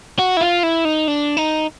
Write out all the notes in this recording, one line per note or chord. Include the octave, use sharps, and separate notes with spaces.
F#4
E4
F4
E4
D#4
D4
D#4